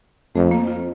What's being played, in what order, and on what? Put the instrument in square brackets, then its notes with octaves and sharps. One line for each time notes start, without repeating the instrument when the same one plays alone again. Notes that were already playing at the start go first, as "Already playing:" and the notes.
[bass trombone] F2 [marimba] A3
[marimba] A#3
F4